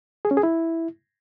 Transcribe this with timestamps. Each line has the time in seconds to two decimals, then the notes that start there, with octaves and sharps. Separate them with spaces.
0.25 G#4
0.31 C#4
0.37 G#4
0.43 E4